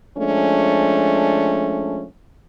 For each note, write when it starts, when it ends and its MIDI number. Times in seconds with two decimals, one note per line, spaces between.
0.17 2.04 53
0.17 2.04 56
0.17 2.04 57
0.17 2.04 61
0.17 2.04 62